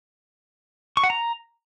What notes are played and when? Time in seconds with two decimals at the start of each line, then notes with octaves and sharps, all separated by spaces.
0.97 C#6
1.03 F#5
1.10 A#5